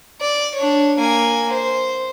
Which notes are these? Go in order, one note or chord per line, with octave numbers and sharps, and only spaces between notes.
D5
D4 C#5
A#3 G#5
C5